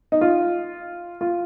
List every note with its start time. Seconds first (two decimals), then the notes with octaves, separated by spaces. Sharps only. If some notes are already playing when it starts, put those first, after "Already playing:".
0.12 D#4
0.21 F4
1.21 F4